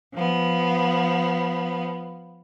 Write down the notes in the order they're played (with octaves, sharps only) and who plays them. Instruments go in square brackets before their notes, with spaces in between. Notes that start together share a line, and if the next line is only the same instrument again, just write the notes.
[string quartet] F3 B3